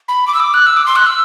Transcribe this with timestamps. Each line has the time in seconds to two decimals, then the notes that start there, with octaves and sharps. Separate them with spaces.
0.08 B5
0.27 D6
0.34 E6
0.40 D6
0.54 F#6
0.66 E6
0.77 D6
0.86 C6
0.96 F#6
1.06 E6